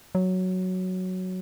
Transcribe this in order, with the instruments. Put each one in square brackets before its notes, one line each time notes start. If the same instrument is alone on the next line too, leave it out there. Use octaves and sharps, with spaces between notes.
[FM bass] F#3